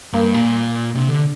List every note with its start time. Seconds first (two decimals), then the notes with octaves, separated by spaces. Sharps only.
0.13 G2 A#3
0.34 A#2
0.95 C3 D4
1.08 D3